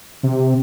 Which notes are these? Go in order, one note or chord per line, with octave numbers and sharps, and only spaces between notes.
C3